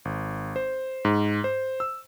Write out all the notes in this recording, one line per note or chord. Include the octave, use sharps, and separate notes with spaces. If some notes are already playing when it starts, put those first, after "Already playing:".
G#1
C5
G#2
C5
E6